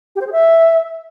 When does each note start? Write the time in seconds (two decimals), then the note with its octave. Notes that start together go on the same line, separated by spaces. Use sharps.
0.16 G4
0.21 C5
0.27 G#4
0.32 E5